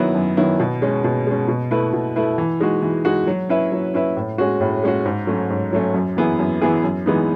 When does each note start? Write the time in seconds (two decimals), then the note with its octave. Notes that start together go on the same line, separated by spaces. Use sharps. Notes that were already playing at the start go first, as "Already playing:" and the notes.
Already playing: D#3 F#3 B3 E4
0.15 F#2
0.37 D#3 F#3 B3 E4
0.60 B2
0.82 G#3 C#4
1.04 B2
1.27 G#3 C#4
1.48 B2
1.71 A3 E4 B4
1.93 B2
2.16 A3 E4 B4
2.38 E3
2.60 G#3 D#4 F#4
2.83 E3
3.05 G#3 D#4 F#4
3.27 F#3
3.49 C#4 E4 B4 E5
3.72 F#3
3.94 C#4 E4 B4 E5
4.16 A2
4.38 G#3 C#4 F#4
4.61 A2
4.83 G#3 C#4 F#4
5.06 G#2
5.27 F#3 A3 C#4
5.50 G#2
5.73 F#3 A3 C#4
5.94 F#2
6.17 E3 B3 E4 G#4
6.39 F#2
6.62 E3 B3 E4 G#4
6.84 F#2
7.06 E3 G#3 B3 D#4